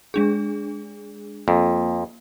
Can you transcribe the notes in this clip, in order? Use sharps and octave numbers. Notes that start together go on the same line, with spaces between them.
G#3 D4 G#4
F2 A#3